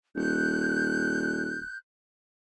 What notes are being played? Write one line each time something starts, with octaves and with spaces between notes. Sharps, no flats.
D#1 F#6 G6